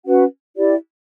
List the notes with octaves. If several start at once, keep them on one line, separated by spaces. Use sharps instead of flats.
C#4 F#4 B4 F#5
E4 G4 D5